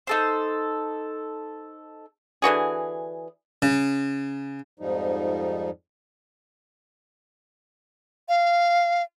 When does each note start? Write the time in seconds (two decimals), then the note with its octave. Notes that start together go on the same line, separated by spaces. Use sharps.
0.07 D#4 A4 C5
2.42 D3 E3 F#4 G#4
3.62 C#3
4.80 F2 G#2 F3 G3 D#4
8.29 F5